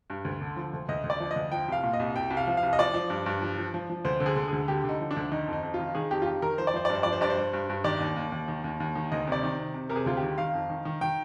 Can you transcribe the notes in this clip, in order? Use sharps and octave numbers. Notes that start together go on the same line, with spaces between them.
G2
D2
D3
F3
D2
D2 D#5
D2
D5
F3
D#5
D2
F3 G5
C2 F5
A#2
D#5
C2
C2 G5
C2
F5
F3
F5
C2
D#5
F3 D5
F3
G2
G2
F3
F3
F3
F3
D2 C5
D3
G#4
D3
D2 G#4
D3 G4
D3 D#4
F3
D4
D2
D#3 D#4
F2
D#4
F2
F4
D#3
D#3 G#4
F2 G4
F4
D#3 G4
D#3 A#4
F3 C5
D5
F3 C5
D5
G2
C5
F3 D5
C5
G2 D5
C5
G2
G2
G2
D#3 D5
D#2
D#2
D#2
D#3
D#2
D#2
D#3
D2 D#5
C3 D5
D#3
C3
C3
C3 A#4
G#4
D2 F4
G4
D#3
D#3 F5
F2
D#3
D#3
D#3 G5